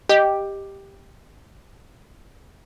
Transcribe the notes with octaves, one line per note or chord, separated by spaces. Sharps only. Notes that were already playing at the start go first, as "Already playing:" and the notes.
G4 D#5